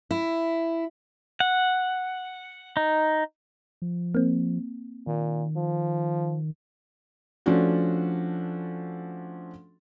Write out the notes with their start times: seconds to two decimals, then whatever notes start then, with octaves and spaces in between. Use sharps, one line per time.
0.11 E4
1.40 F#5
2.77 D#4
3.82 F3
4.15 A#3 C4
5.07 A#2 D#3
5.56 F3
7.46 F3 A3 C#4 D4 F#4